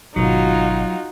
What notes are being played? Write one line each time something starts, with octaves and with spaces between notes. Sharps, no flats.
G#1 B2 F#3 D#4 F4 F#4